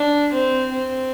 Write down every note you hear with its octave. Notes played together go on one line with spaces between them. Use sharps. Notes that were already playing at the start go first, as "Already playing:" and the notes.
Already playing: D4
C4
C4